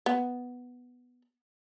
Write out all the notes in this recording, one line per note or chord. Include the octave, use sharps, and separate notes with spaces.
B3